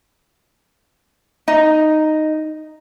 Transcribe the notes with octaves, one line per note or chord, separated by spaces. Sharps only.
D#4